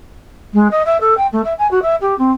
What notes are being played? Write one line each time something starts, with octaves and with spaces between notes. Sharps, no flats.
G#3
D#5
E5
A4
G5
A3
E5
G#5
F#4
E5
G4
C4